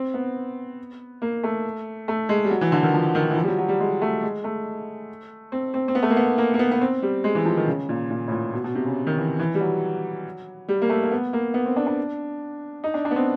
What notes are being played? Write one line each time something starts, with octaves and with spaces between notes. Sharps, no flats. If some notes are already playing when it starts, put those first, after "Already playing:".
Already playing: C4
B3
A#3
A3
A3
G#3
G3
F#3
E3
D3
D#3
F3
D#3
E3
F3
G3
F#3
F#3
G3
G#3
A3
G#3
A3
C4
C4
C4
B3
A3
A#3
B3
A#3
A#3
B3
B3
C4
G3
G#3
E3
F3
D#3
C#3
A#2
A#2
A2
A#2
B2
B2
C3
C#3
D#3
E3
E3
G3
F#3
G3
A#3
A3
A#3
B3
A#3
B3
C4
D4
D4
D#4
D4
D4
B3
C4